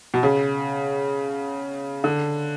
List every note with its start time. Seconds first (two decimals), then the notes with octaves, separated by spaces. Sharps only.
0.14 B2
0.23 C#3
2.04 D3